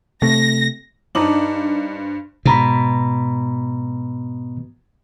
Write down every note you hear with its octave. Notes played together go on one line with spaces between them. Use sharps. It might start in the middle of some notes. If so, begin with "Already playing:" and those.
C3 A3 A#6
G2 D4 D#4 C5 F#7
G#2 B2 A#5 B5